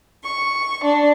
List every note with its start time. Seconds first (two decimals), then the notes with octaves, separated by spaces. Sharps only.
0.24 C#6
0.84 D4